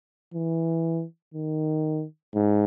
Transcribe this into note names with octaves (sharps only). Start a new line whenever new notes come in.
E3
D#3
G#2